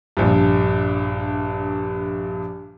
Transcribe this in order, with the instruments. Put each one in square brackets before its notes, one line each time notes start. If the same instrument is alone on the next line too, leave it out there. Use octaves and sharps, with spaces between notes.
[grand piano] A#1 G2